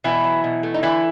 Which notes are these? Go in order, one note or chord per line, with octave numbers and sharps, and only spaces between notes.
B2 E3 E4
F#3
B2
A3
D#4
D3 E3 E4